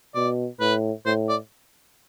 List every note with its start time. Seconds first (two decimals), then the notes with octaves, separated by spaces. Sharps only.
0.15 B2 D5
0.60 A2 B4
1.06 A2 C5
1.29 D5